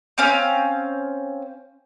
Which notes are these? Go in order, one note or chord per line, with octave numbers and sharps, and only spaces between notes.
C4 C#4 F5